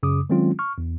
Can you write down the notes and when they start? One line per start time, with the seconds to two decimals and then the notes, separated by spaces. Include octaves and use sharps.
0.03 F#2 C#3 D6 D#6
0.30 D#3 F#3 G#3 C4 C#4 F4
0.59 C#6 F6
0.78 E2